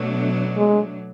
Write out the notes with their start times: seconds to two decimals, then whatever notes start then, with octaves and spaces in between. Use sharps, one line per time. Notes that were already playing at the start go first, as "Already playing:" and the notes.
Already playing: B2 F#3 A3 D4
0.57 G#3